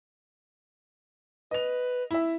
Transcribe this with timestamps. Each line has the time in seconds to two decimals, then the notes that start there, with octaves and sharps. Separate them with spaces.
1.51 B4 D#5 F7
2.11 E4 E5